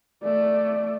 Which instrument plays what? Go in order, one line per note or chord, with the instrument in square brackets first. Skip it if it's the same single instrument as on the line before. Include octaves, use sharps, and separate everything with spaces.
[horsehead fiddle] A3 D5